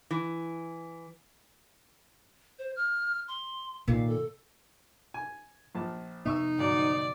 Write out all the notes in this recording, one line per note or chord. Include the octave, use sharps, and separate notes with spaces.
E3
C5
F6
C6
A#2 D#3 F5
A4
G#5
A#1 F3 A5
F2 C3 B3 D#4 E5 C#6 E6
D2 G#2 F#3 D5